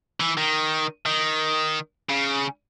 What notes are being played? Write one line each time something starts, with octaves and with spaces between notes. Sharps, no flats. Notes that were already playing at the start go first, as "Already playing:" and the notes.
E3
D#3
D#3
C#3